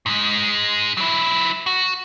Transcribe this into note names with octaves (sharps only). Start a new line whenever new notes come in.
G#2 G#3
F#3 E4
F#4